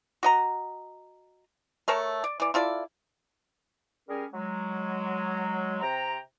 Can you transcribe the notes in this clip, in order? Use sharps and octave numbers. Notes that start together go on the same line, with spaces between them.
F#4 D#5 A#5
A3 A#4 C#5 A5
D5
E3 D5
E4 F4 A4 D5
G3 C#4 G#4 A#4
F#3 G#3
C3 G5 A#5